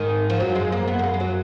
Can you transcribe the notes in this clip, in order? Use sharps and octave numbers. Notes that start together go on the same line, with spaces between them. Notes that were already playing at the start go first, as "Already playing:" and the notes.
Already playing: G#2 D#3
F3
F#2 F#3
G#3
A#3
B3
A#3
G#3
G#3
F#3